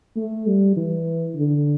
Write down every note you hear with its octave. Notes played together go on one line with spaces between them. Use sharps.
A3
G3
E3
D3